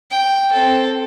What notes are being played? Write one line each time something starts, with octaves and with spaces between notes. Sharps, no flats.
G5
C4 A4